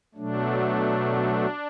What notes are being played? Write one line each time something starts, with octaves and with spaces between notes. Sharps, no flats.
B2 F#3 A3 D4